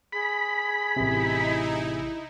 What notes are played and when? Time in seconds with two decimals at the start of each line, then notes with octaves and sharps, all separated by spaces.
0.13 G#4 B5
0.96 A1 C3 D#4 E4